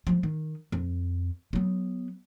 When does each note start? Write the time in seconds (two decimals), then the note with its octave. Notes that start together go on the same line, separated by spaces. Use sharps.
0.07 F3 G#3
0.23 D#3
0.72 F2
1.53 F#3 B3